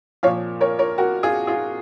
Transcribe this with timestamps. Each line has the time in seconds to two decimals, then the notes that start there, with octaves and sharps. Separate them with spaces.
0.23 A#2 F3 C#5 F5
0.60 A#4 C#5
0.79 A#4 C#5
0.98 F#4 A#4
1.23 F4 G#4
1.47 F4 G#4